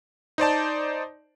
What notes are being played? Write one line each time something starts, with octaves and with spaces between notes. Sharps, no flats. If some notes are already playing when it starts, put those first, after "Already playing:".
D#4 C5 D5 A5